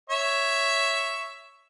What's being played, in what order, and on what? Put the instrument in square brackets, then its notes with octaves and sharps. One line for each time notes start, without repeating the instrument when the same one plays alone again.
[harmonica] C#5 E5 C#6